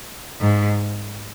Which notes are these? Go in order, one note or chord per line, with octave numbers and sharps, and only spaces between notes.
G#2